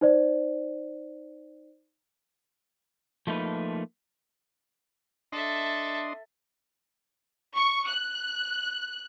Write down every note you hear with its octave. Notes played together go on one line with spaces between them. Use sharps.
D#4 C5 D5
F3 A3 A#3 D#4 B4
D4 A4 D#5 E5 C6
C#6
F#6